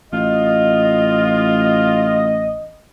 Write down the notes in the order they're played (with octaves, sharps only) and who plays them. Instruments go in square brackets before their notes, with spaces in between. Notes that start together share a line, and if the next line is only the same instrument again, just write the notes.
[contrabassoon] A1 [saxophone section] F4 [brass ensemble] D#5